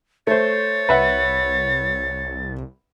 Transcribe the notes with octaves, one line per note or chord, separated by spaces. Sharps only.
A3 C5 C#5 A6
C2 B4 E5 F#5